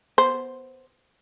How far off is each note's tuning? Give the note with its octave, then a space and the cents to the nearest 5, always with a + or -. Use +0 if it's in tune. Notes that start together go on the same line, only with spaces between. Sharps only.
B3 +0 C5 +0